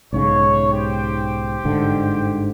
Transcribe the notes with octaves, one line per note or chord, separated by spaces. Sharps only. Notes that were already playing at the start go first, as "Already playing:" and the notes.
B1 G#2 C#3 C#5
G4 C5 G5
G1 G#2 D3